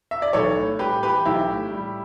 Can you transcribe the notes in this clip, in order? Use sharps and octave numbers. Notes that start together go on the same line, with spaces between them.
E5
D5
B1 A4 C#5
A2
G3 G4 B4
E3 G4 B4
B1 E4 G4
A2
G3